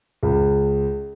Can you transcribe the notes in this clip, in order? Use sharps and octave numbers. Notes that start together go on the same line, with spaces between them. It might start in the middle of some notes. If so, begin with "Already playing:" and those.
C#2